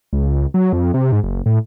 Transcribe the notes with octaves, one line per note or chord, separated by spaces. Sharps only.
C#2
F#3
F2
C3
G#2
F#1
A2